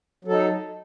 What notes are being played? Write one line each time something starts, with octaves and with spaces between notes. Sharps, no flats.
F#3 D#4 A4